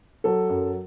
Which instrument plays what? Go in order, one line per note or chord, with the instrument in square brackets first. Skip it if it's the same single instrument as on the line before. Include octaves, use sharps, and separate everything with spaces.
[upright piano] F#3 A4
F#2